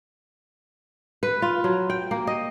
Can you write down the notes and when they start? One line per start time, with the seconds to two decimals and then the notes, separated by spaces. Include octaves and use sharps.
1.23 B4
1.42 F4
1.64 F#3
1.90 G5
2.11 A#3
2.27 D#5